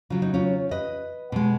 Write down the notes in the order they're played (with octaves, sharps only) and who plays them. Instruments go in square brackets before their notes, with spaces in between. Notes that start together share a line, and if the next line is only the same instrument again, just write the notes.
[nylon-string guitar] C#3 F#3 F4
D#4
C#4 F4
B4 D#5
B2 G#3